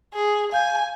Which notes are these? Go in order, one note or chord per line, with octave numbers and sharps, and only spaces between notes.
G#4
F5 G#5 G6